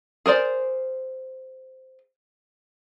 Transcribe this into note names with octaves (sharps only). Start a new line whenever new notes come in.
G#4 A#4 C5 D5